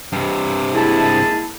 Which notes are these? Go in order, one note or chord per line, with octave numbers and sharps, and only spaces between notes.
G2 C3
G#3 A#3 E4 G#4 A5